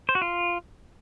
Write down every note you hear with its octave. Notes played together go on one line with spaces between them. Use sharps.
C5
F#4
F4